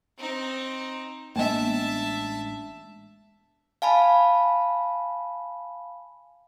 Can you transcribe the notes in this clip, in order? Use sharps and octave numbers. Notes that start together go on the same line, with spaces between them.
C4 D#4
A1 G#3 A#3 B3 D4 D#5 E5 A5
F5 G#5 A5 B5